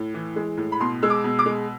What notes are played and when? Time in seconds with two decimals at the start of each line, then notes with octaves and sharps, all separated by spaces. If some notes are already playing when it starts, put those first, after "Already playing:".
Already playing: A2
0.14 E3
0.36 G#3
0.57 A2
0.72 B5
0.80 B2 C6
1.02 G#3 E6
1.10 D6
1.24 B2
1.39 D6
1.46 G#3